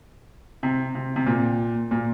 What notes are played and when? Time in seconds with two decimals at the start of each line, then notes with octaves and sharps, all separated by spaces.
0.63 C3
0.95 C3
1.16 C3
1.26 A#2
1.91 A#2